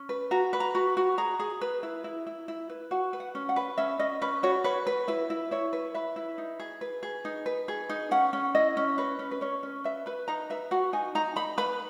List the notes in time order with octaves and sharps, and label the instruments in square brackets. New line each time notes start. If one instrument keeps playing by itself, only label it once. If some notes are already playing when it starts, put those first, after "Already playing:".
Already playing: [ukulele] C#4
B4
F#4 A#5
B4
A#5
F#4
F#4
G#4 A#5
G#4
B4
E4
E4
E4
E4
B4
F#4 F#5
B4
F#5
C#4
F#5
B4
C#4 E5
C#4 D#5
C#4 B4
F#4 C#5
B4 C#5
B4
E4 B4
E4
E4 C#5
B4
B4 E5
E4
D#4
G#4
B4
G#4
D#4
B4
G#4
D#4
C#4 F#5
C#4
E4 D#5
C#4
B4 C#5
C#4
B4
C#4 C#5
C#4
B4 E5
B4 B5
D#4 A#5
B4 E5
F#4 F#5
D#4 G#5
D#4 A#5
D#4 B5
B4 B5